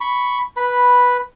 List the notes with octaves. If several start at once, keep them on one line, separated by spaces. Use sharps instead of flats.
B5 C#6
B4 B5